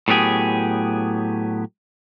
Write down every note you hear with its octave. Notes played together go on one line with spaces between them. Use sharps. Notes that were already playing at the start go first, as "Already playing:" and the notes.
A2 F#3 B3 G4 G#4